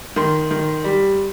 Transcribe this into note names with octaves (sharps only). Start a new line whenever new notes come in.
D#3 C6
D#3
G3